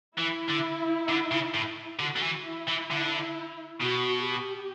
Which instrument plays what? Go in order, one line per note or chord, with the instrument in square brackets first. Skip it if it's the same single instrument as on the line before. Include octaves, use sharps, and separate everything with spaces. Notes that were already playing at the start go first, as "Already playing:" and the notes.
[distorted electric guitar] E3 [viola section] E4
[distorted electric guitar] D3
D3
C#3
A2
[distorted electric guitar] D3 [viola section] F#4
[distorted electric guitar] D3
E3
[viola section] E4
[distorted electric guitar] E3
D3
[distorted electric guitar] B2 [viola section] F#4
[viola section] G4